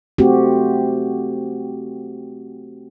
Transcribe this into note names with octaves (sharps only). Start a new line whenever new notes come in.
A3 C4 F#4 G4